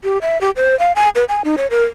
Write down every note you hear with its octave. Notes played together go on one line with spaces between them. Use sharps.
G4
E5
G4
C5
F5
G#5
B4
G#5
D#4
C#5
A#4